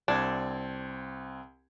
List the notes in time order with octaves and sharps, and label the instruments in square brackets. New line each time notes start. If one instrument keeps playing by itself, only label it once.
[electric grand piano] C2 C4 G#6 [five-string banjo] D4